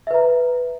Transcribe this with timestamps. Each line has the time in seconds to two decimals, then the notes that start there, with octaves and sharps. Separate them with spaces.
0.07 E5
0.11 B4
0.14 A#5